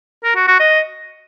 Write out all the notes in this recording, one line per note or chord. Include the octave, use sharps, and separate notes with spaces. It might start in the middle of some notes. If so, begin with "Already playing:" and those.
A#4
F#4
F#4
D#5